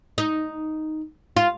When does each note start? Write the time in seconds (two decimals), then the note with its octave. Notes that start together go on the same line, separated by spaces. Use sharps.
0.18 D#4
1.37 F4